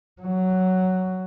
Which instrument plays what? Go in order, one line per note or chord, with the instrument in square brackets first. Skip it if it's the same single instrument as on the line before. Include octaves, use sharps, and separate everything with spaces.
[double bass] F#3